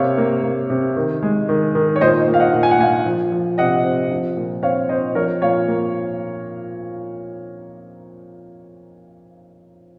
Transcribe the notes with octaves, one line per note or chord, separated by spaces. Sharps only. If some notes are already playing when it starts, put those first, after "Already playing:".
Already playing: C3 A#3 C#5 F5
A#3
A#3
C3
D#3
G#3
D#3
D#3
C#5
A#2 C5 D#5
A#2
F5
D#5 F#5
A#2
G#5
F#5
A#2 F5 G#5
F3
F3
C3 D#5 F#5
C4
F3
A#2
C4 C#5 F5
C4 C5 D#5
F3 A#4 C#5
A#2 C#5 F5
A#3